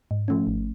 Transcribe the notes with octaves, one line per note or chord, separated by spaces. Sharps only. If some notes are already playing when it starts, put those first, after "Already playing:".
G#2
F3 A3 C#4
G#1